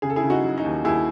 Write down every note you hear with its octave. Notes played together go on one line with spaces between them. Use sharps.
C#3 G#4
A4
E4 G#4
C#3
D#4 F#4
F#3
D#4
D#2
D#2 E4 G#4